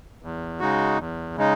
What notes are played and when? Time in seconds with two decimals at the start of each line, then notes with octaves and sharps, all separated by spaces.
0.22 E2
0.59 C#3 G#3 D#4 F#4
0.98 E2
1.36 C#3 G#3 D#4